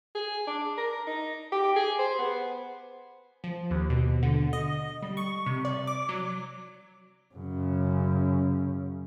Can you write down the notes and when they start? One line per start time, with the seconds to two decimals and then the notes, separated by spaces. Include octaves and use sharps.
0.15 G#4
0.48 D4
0.78 A#4
1.07 D#4
1.52 G4
1.76 G#4
1.99 C5
2.19 B3
3.44 F3
3.71 D#2
3.90 B2
4.23 D3
4.53 D#5
5.02 G3
5.17 C#6
5.46 C3
5.65 D5
5.87 D6
6.09 F#3
7.35 F#2 C#3